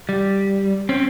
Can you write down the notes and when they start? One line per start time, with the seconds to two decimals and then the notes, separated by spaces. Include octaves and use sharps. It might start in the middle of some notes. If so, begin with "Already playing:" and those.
0.09 G3
0.89 C4 C#4